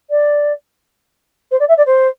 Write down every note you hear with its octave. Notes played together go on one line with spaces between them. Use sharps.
D5
C5
D5
E5
D5
C5